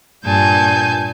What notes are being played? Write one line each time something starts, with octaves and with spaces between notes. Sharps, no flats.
G2 A#2 G#5 A5 G6